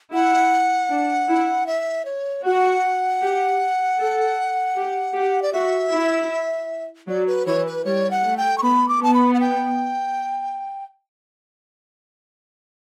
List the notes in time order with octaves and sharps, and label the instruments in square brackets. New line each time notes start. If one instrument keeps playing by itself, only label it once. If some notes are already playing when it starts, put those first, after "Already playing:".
[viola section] E4 [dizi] F#5
[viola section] D4
E4
[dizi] E5
C#5
[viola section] F#4 [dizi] F#5
[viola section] G4
A4
G4
G4
[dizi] D5
[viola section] F#4 [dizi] E5
[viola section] E4
[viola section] F#3 [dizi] D5
[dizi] B4
[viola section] E3 [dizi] C#5
[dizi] B4
[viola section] G3 [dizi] C#5
[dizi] F#5
[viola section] A3
[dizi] G5
C#6
[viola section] B3 [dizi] B5
[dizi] D6
[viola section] B3 [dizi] A5
[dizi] B5
F#5
G5